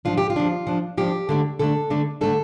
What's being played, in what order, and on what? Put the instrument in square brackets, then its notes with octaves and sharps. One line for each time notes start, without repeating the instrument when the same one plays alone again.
[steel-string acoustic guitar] F3 D4 F4
G4
F4
F3 D4
F3 D4
F3 D4 G4
D3 A3 D4
D3 A3 D4 A4
D3 A3 D4
D3 A3 D4 A4